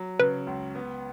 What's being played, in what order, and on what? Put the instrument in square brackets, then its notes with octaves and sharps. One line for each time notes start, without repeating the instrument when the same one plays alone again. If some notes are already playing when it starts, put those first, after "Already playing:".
Already playing: [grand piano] F#3
[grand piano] C#3 [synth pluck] B4
[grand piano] C#2
B3